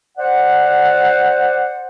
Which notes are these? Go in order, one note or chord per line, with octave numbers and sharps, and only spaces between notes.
C5 D5 F#5